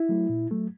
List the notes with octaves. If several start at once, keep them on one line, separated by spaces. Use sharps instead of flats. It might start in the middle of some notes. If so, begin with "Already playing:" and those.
Already playing: E4
F#3 A3
A#2
F#3 A3